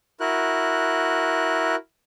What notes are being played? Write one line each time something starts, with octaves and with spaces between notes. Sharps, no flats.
E4 F#4 A#4 F#6